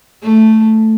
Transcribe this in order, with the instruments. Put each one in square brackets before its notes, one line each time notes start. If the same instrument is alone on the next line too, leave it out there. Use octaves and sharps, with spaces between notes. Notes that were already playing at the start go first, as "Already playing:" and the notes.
[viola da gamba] A3